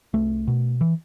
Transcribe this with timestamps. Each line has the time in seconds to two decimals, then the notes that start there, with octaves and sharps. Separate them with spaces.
0.14 C2 A3
0.47 B2
0.81 E3